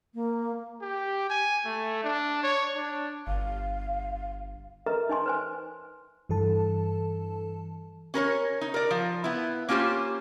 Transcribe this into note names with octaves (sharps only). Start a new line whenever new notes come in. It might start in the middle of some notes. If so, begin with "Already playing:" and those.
A#3
G4
G#5
A3
D4
C#5
D4
G1 F5
A#4 B4 D#5 E5 A#5
D#4 D#5 G#5 C6
B4 C5 G#5
G2 E3 A4 A5
C#4 A#4 B4 C#5
D#4
A#4 D5
F3
B3 E4
A#3 C#4 F4 G4 C5